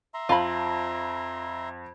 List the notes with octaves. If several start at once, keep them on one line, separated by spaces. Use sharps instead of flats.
E5 A#5 C6
F2 F4 F5 B5